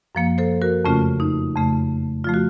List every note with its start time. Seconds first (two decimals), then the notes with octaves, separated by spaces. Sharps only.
0.15 F#2 F3 A#3
0.38 A4 C5
0.62 F#4 A#4
0.85 F2 C#3 A3 C#4 F4
1.20 D#4
1.55 F2 C#3 A3
2.24 F3 A3 F4
2.34 F#4